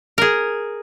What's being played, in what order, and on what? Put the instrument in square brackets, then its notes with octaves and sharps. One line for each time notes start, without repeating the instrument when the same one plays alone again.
[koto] G#4 A#4